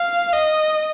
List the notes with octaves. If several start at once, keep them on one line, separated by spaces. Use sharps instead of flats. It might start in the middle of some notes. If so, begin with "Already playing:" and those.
Already playing: F5
D#5